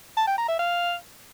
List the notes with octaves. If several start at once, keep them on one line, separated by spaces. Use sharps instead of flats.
A5
G5
A#5
E5
F5